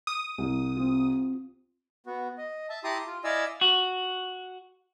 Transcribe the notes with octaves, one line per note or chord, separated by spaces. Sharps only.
D#6
C2
C4 F4
B3 F#4
D#5
E5 A5
E4 G4 A5 A#5 C6 D#6
F4
E4 D5 D#5 F5 G#5 E6
F#4